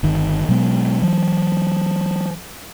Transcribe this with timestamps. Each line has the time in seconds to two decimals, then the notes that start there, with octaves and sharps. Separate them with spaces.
0.03 G1 D#3
0.49 B2 F#3 G#3 B3
1.02 E3 F#3